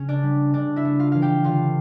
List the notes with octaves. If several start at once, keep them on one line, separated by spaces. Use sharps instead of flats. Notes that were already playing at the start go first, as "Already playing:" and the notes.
Already playing: C#3 C#4
D4 D5
G3
C#3 D4 D5
E4 E5
A3
F4 F5
E3 F5
G4 G5
D3 F4 F5